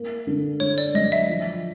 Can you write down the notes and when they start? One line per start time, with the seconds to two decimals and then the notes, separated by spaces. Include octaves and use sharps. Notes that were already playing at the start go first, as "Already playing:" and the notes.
Already playing: A#3
0.27 D3
0.60 D3 C#5
0.78 D5
0.94 F#3 D#5
1.12 E5
1.29 F3